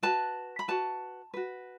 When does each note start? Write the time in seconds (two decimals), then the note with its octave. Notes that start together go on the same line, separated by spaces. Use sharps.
0.03 F#4 B4 A5
0.59 B5
0.68 F#4 B4 A5
1.34 F#4 B4